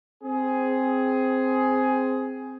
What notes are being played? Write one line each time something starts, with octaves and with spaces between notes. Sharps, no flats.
C4 G#4